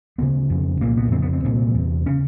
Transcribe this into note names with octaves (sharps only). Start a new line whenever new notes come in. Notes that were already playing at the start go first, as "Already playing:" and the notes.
D2 C#3 B3
F2 C#3
C2 A#2 A#3
B3
F2 C#3 C4
B3
C4
C2 A#2
E2 C3
C#3 C#4